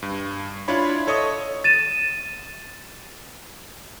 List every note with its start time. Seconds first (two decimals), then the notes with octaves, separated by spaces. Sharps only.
0.02 G2
0.68 D4 E4 F4 C#5 B5
1.07 A4 C#5 D#5 C#6 D#6
1.64 A6 D#7 E7